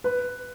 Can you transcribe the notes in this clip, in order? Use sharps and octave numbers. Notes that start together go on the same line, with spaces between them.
B4